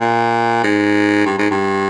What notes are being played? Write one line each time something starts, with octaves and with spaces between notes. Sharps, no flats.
A#2
G#2
G2
G#2
G2